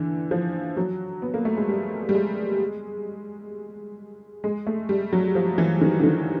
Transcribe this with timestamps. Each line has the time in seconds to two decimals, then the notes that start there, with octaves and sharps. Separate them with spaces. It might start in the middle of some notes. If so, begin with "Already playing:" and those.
Already playing: D3 E3
0.31 F3
0.77 F#3
1.22 B3
1.34 A#3
1.45 A3
1.57 G#3
1.69 G3
2.09 G3
2.15 G#3
4.44 G#3
4.67 A3
4.89 G3
5.13 F#3
5.35 F3
5.58 E3
5.81 D#3
6.00 D3
6.04 D#3